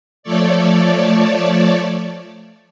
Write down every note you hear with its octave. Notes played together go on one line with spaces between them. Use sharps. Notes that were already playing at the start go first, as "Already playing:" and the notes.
F3 A3 A4 C#5 D5